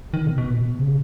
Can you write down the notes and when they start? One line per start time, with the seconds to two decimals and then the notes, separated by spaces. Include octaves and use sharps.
0.14 D#3
0.26 B2
0.38 B2
0.50 A#2
0.63 B2
0.79 C#3